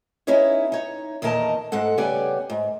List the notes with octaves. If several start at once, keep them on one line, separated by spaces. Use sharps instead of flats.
B3 C#4 D#4 E4 G#4 C#5
D#4 C#5
E2 A#2 D#3 A#4 D#5 A5
G#2 G#3 A4 F#5
C#3 G3 B3 G4 D5 G#5
G#2